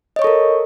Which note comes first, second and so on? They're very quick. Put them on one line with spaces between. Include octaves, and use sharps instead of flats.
D#5 C#5 C#6 A4 A#4